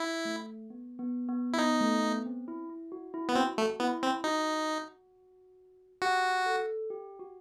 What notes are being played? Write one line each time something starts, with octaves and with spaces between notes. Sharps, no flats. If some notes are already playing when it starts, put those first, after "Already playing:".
Already playing: E4
A3
B3
B3
B3
E4
B3 D#4
A3
B3
C4
E4
E4
F#4
E4
B3
C4 F#4
A3
B3 E4
C4
D#4 F#4
F#4 G4
A4
G4
F#4